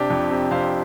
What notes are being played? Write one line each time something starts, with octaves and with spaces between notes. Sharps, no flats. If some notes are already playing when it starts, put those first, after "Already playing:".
Already playing: C3 D4 G4
F2
C3
F2 C5 F5